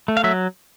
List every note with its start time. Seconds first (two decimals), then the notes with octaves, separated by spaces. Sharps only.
0.08 A3
0.17 F5
0.24 F#3 E5